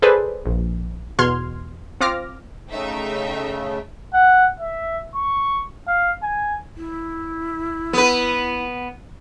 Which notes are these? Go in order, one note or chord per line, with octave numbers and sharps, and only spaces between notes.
G#4 A4 B4 C5 D5
A#1
E2 B2 C6 F6 G#6
C4 F4 D6 F6 A#6
C#3 A3 D#4 E5 G5
F#5
E5
C#6
F5
G#5
E4
B3 B4